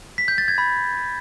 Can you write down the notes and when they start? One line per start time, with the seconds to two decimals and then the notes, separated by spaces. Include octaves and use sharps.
0.18 B6
0.28 G6
0.38 A6
0.48 G#6
0.58 B5